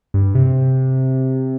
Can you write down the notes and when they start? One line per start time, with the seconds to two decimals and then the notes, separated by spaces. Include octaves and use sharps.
0.14 G2
0.35 C3